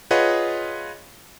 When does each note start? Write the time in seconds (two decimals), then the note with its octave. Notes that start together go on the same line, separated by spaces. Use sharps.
0.11 F4 G#4 B4 C#5 D#5 F#5